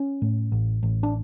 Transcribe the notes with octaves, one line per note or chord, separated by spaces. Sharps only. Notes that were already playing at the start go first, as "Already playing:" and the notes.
Already playing: C#4
A2
A1
A1
D4